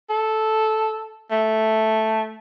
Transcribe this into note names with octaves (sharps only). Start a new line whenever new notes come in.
A4
A3